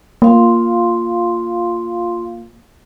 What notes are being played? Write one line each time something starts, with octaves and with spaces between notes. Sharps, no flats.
A#3 F4 F5 C6